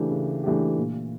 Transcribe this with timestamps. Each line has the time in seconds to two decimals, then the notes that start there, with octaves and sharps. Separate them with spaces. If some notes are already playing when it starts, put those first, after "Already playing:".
Already playing: C#3 E3 A3 D4 G4
0.11 C#3
0.43 E3 A3 D4 G4
0.77 A#2